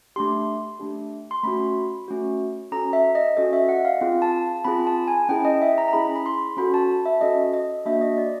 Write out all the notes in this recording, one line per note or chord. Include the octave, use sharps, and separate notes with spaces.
A3 D4 G4 C6
A3 D4 G4
C6
A3 C#4 F#4 B5
A3 C#4 F#4
C#4 F#4 A4 A#5
E5
D#5
C#4 F#4 A4 D#5
E5
F#5
F5
C4 F4 G#4
A5
C4 F4 G#4 B5
A5
G#5
C#4 E4 G#4 G5
D#5
E5
A#5
A#5
C#4 E4 G#4 B5
B5
C6
C#4 F#4 A4 B5
A5
E5
C#4 F#4 A4 D#5
D#5
A#3 D4 F#4 E5
D#5
D5